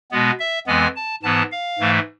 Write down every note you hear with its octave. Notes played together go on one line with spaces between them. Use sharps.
B2 G#3 B3
E5
F2 E3 G#3 B3 G#5
A5
G#2 E3 B3 A5
F5
G#2 E3 A3